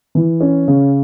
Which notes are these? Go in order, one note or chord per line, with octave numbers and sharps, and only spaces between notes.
E3
C#4
C#3